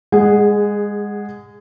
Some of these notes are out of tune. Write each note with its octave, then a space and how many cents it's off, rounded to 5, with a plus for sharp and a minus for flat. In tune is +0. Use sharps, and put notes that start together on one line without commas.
G#3 -25 G#4 +0 F#5 +0